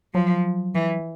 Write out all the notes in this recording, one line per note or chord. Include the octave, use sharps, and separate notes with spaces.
F3 F#3
E3